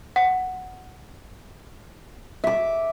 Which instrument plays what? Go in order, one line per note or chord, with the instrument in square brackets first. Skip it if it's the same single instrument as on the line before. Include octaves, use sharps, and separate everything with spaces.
[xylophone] F#5
[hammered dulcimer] E5 D6